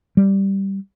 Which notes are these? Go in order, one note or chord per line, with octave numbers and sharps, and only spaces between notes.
G3